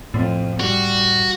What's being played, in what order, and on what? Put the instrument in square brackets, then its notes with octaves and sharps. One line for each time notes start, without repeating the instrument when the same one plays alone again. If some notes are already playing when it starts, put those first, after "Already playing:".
[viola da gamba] F2 [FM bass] A2
[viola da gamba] G3 [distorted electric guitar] F#4